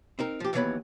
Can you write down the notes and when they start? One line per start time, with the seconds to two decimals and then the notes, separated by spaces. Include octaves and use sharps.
0.19 C4 D#4 A#4
0.40 F3 G4
0.53 D#2 E3 F#3 B3 C#5 B5